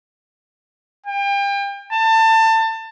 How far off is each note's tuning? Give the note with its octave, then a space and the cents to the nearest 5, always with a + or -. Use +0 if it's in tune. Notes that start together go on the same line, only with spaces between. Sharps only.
G5 +35
A5 +25